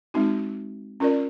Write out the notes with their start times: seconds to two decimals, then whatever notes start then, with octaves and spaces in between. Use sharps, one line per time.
0.14 G#3 C4 D#4 F#4
1.00 C#4 F4 A#4 D5